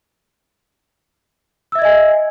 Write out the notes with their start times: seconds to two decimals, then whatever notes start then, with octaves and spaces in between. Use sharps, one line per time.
1.72 E6
1.75 E5
1.79 G#6
1.82 D#5
1.85 G#5